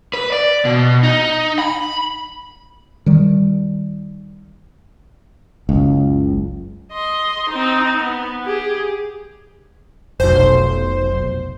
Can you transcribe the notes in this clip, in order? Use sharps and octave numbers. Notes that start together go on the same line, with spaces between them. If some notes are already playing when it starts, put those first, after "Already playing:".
B4
D5
B2
D#4
B5
D#3 G3
F#1 C#2
D#5 C6
C4 D#4
B3
G4 G#4
F1 B1 C5